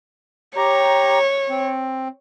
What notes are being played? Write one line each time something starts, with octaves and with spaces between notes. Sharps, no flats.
G4 C#5 A#5
C4